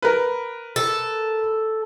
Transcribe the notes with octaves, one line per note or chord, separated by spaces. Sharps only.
A#4 B4
A4